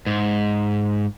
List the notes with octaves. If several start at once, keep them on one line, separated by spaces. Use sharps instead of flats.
G#2